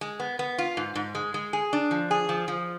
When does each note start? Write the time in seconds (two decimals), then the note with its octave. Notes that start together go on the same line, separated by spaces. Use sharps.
0.01 G#3
0.20 B3
0.39 B3
0.58 F4
0.77 G#2
0.95 G#2
1.15 G#3
1.34 G#3
1.53 G#4
1.73 D4
1.91 F3
2.11 G#4
2.29 F3
2.48 F3